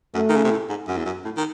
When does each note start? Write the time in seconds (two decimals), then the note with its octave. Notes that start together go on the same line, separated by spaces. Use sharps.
0.15 F#2 A3
0.30 D#3
0.36 C#3
0.44 C3
0.51 A2
0.69 G#2
0.88 F#2
0.97 E2
1.06 F#2
1.25 A2
1.37 D#3